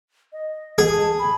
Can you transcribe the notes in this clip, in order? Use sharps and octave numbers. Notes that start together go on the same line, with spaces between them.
D#5
G#4
A5
B5